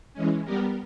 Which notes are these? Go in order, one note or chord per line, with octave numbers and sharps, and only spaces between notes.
E3 G#3 C#4
G3 B3 G4 A#4